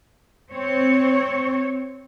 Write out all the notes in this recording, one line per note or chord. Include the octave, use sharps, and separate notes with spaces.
C4 C#5